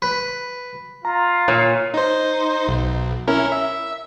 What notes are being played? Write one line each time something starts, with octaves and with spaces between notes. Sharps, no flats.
B4
F4 A#5
A#2 C#5
D#4 C5
B1
C#4 E4 A#4
E5